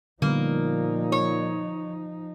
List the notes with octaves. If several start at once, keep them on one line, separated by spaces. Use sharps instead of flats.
A#2 D3 F3 G3 A#3 B3 D#4
C#5